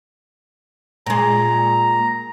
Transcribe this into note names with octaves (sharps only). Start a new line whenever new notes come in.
A#2 G#3 A#5